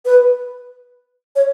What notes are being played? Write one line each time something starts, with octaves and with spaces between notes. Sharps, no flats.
B4
C#5